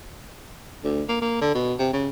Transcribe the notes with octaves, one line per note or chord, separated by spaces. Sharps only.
D2
A#3
A#3
D3
B2
C3
C#3